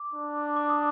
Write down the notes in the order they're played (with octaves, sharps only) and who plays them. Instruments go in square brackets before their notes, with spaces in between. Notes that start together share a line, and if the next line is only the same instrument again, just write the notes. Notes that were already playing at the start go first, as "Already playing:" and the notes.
Already playing: [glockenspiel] D6
[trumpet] D4
[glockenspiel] D6
D#6